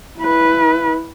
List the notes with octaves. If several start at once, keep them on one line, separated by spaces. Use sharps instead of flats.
E4 B4